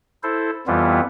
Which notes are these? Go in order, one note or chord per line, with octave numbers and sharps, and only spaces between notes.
E4 A4 C5
F2 E3 G3 B3 F4